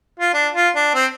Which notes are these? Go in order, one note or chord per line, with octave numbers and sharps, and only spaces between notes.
F4
D4
F4
D4
C4